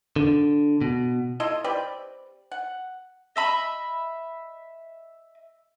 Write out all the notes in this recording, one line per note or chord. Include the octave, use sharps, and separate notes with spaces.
D3
B2
E4 F4 A4 D#5
C4 G4 B4 D5
F#5
D#5 E5 B5